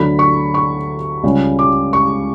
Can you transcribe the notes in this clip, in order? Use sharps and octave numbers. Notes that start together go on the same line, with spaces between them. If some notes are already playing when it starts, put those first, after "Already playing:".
Already playing: D2 D3 F#3 B5
C#6
C#6
C#2 C#3 G3
D6
C#6